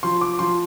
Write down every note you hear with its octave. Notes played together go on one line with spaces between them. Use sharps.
F3 C6
D6
F3 C6